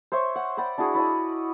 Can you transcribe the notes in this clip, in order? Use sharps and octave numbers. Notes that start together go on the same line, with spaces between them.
C5 C#5 E5 C#6
F#5
D5 F#5 G5 B5
D4 E4 F#4 G#4
E4 D5 D#5 A5